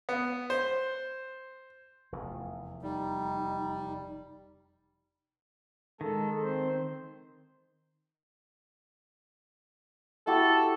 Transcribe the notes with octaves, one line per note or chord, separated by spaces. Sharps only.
B3
C5
F1 E2
G3 D#4
D#3 G#3 A4
C4 C5
E4 F#4 G4 A4